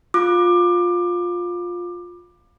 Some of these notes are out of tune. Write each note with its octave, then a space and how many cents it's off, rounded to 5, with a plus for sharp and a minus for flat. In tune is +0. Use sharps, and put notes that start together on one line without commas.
F4 +15 D6 +20